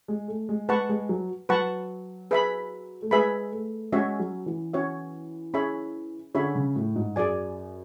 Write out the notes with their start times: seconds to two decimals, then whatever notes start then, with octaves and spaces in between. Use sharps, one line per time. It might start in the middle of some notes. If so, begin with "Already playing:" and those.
0.08 G#3
0.28 A3
0.49 G#3
0.69 G#3 B4 F#5 A5 C#6
0.89 G#3
1.09 F#3
1.49 F#3 B4 F#5 A5 C#6
2.31 G#4 B4 E5 B5
3.02 A3
3.11 G#3 G#4 B4 E5 B5
3.52 A3
3.92 G#3 C#4 F#4 C#5 E5
4.20 F#3
4.46 E3
4.73 C#4 F#4 C#5 E5
5.54 C#4 G#4 C#5 E5 B5
6.34 D3 C#4 G#4 C#5 E5 B5
6.55 C#3
6.76 A2
6.96 G#2
7.16 F#2 G#4 D5 G#5